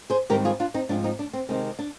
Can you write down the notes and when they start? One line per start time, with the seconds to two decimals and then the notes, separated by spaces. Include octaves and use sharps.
0.10 G#4 C5
0.30 G#2 D#3 G3 C4 G4 A#4
0.45 F4 G#4
0.60 D4 F4
0.74 C4 D#4
0.89 G#2 F3 C4 D4
1.04 C4 D#4
1.19 D4
1.33 C4
1.49 C3 D#3 G#3 C4
1.79 D4